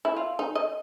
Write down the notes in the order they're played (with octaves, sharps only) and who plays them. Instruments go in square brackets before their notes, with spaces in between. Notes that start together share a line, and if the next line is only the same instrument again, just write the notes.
[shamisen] E4
F4
D#4
D#5